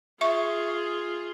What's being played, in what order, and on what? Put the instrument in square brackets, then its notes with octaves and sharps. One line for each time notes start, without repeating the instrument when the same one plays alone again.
[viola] F4 G#4 [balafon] E5 C#6